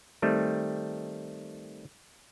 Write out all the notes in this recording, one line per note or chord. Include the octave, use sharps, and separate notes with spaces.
D#3 G3 A3 C4